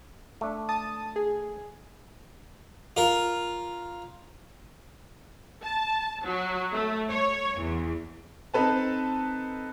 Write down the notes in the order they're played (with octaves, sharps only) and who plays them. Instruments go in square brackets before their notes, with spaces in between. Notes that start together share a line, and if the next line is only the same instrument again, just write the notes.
[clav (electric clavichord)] A3 D4
[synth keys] A5 D#6
G#4
[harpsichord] F4 A#4
[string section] A5
F#3
A3
C#5
E2
[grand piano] C4 D#4 A4 B4 A5